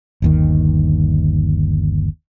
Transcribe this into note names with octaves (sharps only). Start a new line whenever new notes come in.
G1 D#2 D#3